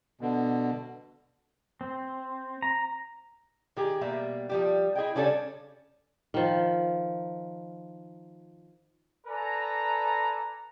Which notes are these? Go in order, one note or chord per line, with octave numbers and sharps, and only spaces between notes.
B2 D3
C4
A#5
D#3 G4 G#4
B2 G3 A#3 E5
F3 G3 G4
E4 G#4 D#5 G5
C#3 G3 C#4 D4 A4 D5
D#3 F3
A4 B4 D5 G#5 A#5